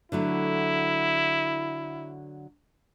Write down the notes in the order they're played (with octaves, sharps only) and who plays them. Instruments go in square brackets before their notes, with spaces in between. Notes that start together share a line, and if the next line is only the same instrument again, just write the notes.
[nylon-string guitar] D3 F#3 A3 [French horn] E4